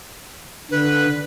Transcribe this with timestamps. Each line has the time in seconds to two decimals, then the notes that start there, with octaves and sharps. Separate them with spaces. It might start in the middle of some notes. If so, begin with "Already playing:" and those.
0.71 D3 B4